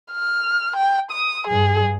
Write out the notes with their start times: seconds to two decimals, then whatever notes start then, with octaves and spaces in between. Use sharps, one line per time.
0.12 F6
0.76 G5
1.11 D#6
1.47 G2 G#4